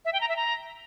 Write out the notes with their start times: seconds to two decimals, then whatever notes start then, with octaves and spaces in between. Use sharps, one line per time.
0.05 E5
0.13 G5
0.21 A#5
0.29 E5
0.36 A#5